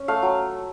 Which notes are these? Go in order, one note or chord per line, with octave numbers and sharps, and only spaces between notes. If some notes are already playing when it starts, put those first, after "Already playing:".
Already playing: C#4
A3 F5
F#3